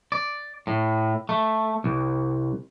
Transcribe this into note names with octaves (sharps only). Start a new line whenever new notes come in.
D5
A2
A3
C2